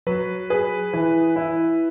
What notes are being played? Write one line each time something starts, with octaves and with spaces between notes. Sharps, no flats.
F#3 B4
G#4 B4
E3
E4